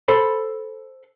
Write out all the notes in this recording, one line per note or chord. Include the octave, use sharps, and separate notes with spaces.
A4 C5 B5